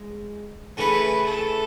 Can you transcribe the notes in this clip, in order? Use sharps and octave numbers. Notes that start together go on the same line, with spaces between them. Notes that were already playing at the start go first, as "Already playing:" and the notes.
Already playing: G#3
C#3 E3 A3 C#4 E4 B4
A4